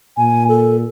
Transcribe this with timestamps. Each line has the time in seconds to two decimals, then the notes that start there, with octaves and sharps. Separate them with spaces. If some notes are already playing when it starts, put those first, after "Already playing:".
0.17 A#2 G#5
0.49 A4